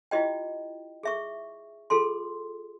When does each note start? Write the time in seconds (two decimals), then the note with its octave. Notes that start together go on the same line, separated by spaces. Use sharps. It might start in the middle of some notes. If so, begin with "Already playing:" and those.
0.11 E4 F4 G4 D#5 G5
1.03 G#4 E5 C#6
1.90 F4 G#4 A4 C6